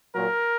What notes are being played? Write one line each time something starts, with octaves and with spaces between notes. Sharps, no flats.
A#2 F#3 A#4